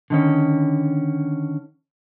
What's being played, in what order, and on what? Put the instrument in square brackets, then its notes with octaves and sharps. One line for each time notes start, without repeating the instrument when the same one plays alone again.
[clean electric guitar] D3 D#3 C#4